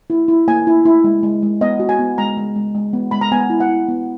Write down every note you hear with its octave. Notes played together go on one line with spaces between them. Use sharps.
E4
E4
A#3 G#5
E4
E4
G#3
G#3
G#3
B3 D#5
F#4
G#5
B3
G#3 A#5
G#3
G#3
G#3
B3
G#3 B5
A#5
B3 G#5
E4
F#5
E4
B3